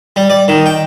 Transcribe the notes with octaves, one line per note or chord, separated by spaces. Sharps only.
G3
D5
D#3
G5